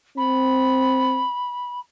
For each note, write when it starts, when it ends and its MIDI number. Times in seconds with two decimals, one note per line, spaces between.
0.17 1.24 60
0.17 1.80 83